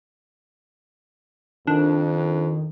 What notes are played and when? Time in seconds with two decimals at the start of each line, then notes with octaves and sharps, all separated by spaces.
1.67 F2 D#3 D4